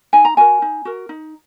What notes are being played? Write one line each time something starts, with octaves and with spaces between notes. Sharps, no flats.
D#4 G#5
A#5
F#4 A#4 G#5
D#4
F#4 A#4
D#4